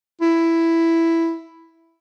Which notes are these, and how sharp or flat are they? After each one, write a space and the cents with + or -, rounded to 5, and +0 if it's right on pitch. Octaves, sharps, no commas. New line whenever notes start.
E4 +5